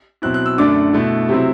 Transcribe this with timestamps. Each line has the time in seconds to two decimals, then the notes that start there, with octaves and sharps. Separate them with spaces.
0.22 B2 F#3 C4 E4 F#6
0.34 F#6
0.46 E6
0.58 F#2 D3 A3 D4 D6
0.93 B2 A3 E4
1.29 C3 F#3 C4 E4